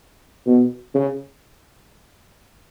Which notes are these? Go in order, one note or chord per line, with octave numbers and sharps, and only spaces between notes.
B2
C#3